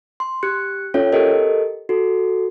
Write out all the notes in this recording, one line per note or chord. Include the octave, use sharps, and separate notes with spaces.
C6
G4 F#6 C#7
C#4 F4 A4 C#5 E5 G5
G4 A4 A#4 D#5
F#4 A4